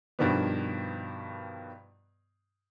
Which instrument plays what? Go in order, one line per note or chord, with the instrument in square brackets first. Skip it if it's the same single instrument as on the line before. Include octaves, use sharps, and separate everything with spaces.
[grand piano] G2 B2 D#3 F3 G3 B3